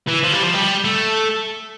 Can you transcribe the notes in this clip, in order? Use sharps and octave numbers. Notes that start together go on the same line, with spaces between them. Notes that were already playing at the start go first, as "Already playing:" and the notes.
E3
F3
G3
F3
G3
A3